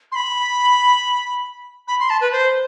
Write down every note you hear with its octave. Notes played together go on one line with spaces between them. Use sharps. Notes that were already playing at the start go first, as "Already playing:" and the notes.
C6
B5
B5
C6
A5
B4
C5